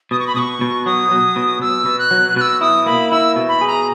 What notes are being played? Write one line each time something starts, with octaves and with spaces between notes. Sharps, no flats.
B2 D#6
C#6
B5
B2 C#6 D#6
B2
F#3 D#6
F#3
B2
B2 E6
B2
F#6
F#3
B2 E6 F#6
E4 D#6
A#3 B5
E4 E6
B2
B5
G#4
A#5